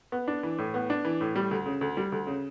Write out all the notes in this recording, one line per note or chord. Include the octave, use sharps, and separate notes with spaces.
B3
D4
E3
A2
B3
D4
E3
A2
G3
D2
C#3
D2
G3
D2
C#3